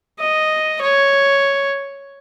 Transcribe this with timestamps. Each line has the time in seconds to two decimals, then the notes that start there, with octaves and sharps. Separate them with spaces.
0.20 D#5
0.82 C#5